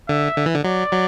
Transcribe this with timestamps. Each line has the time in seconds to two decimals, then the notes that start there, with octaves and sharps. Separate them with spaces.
0.09 D3 E5
0.37 D3
0.46 E3
0.55 D3
0.64 F#3 D5
0.92 F#3